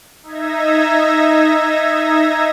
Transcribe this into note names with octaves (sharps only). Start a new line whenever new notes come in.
D#4 E5 G#6 A#6